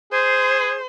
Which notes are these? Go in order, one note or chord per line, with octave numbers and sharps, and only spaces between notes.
G#4 C5